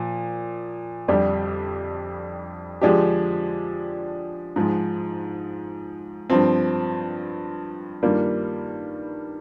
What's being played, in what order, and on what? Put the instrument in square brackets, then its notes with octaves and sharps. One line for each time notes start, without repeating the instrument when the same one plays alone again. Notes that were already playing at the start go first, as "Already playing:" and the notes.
Already playing: [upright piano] A#2 F3
F2 D3 G3 D4 G4
D3 F3 G#3 D4 G4
G#2 F3 G#3
G2 F3 C4
G2 D#3 G3 A#3 F4